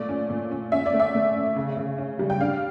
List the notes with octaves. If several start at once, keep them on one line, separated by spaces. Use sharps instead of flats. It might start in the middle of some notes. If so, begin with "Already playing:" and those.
Already playing: A#2 A3 D5
C#4
A#2
C#4
C#4 E5
D5
A3
E5
A3
C#4
C#3
C#3
C#4
G3
G5
D4 F5